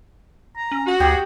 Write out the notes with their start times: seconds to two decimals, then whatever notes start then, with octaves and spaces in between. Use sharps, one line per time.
0.56 A#5
0.72 C#4
0.87 F#4
1.00 D2 G4 G#4